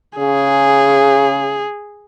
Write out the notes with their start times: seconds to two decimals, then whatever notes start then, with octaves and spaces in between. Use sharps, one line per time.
0.18 C#3 G#4